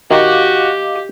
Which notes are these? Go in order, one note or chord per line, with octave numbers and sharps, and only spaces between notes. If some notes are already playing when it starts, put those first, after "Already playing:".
D#3 F#4 G4 D#5 F5 D6